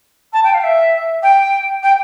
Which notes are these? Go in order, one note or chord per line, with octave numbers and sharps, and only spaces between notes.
A5
G5
F5
E5
G5
G5